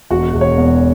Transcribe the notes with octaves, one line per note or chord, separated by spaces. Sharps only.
E1 F#4 F#5
E1
C#5
E2